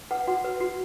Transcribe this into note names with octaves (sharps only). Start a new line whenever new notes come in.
B4 F#5
F#4 F#5
B4
F#4